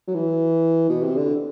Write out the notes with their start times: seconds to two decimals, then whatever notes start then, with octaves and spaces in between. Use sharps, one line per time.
0.08 F#3
0.15 E3
0.89 B2
1.03 C3
1.16 D3